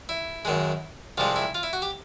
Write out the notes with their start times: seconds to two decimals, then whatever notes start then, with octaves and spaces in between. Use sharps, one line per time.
0.09 E4
0.45 F#2 D#3 G#3
1.18 C2 C3 F3 G#3 F4
1.36 E4
1.55 F4
1.63 E4
1.73 F#4
1.82 G4